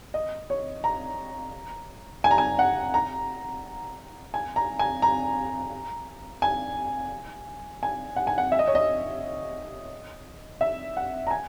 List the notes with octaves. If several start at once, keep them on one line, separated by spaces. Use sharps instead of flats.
D#5
C#5
A#5
G#5
A#5
G#5
F#5
A#5
G#5
A#5
G#5
A#5
G#5
G#5
F#5
G#5
F#5
E5
D#5
C#5
D#5
E5
F#5
A#5
G#5